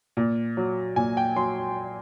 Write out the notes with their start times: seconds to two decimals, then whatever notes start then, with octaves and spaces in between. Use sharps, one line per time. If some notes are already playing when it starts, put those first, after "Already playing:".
0.17 A#2
0.57 F#3
0.96 A#2 G#5
1.17 G5
1.36 F#3 C6